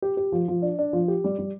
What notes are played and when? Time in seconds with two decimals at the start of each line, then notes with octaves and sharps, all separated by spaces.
0.02 G4
0.17 G4
0.32 F3
0.48 F3
0.62 D4
0.79 D4
0.93 F3
1.08 G4
1.24 G3
1.39 G3